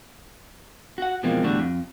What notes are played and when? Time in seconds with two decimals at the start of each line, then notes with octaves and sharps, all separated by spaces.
0.98 F#4 F#5
1.23 B2 E3 F3 G#3 A#3 C4
1.43 E2 A2 D3 G3 F#4
1.59 F2